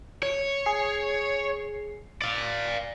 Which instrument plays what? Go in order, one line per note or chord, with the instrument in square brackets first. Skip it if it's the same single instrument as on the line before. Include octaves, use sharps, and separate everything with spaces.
[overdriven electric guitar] C#5
[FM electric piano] G#4 C7
[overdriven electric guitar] D5 F5 [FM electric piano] A6